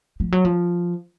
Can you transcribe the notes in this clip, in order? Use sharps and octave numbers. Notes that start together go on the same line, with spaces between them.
F3
F#3
F3